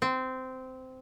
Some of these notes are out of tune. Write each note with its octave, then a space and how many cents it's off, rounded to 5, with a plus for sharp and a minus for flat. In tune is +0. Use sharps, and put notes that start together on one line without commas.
C4 -15